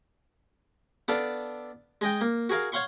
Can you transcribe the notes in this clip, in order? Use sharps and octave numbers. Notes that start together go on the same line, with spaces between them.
B3 D4 A4 D5 F5
G#3 D#5 G5
A#3
F#4 G#4 A#4 F5
C#5 F5 F#5 C6 C#6